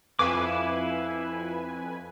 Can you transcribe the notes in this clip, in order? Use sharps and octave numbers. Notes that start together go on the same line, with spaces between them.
F2 E4 B4 F5 G#5 D6